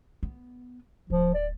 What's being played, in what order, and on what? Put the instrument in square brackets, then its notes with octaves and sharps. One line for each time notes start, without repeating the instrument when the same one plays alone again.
[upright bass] B3
[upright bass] D1 [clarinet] F3
[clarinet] D5